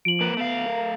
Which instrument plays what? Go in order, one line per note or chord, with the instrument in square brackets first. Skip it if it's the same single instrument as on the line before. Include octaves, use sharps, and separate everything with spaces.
[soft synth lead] F3 [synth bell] D7 F#7
[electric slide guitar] A#3 B4
[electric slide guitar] A3 F5 [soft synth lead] B3
[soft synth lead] A#4